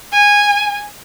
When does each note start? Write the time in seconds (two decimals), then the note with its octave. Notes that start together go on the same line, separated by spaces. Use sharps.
0.13 G#5